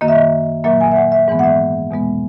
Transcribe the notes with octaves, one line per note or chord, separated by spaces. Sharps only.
F#2 D#3 A#3 D#5
E5
D#5
A#2 F#3 A#3 E5
G#5
E5
F#5
E5
G#2 E3 G#3 B3
F#5
E5
E2 B2 G#3 B3